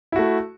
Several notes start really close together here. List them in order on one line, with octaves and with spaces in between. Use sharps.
E4 F#4 A3